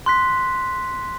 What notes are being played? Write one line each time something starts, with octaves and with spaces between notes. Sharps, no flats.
C6 F#6 B6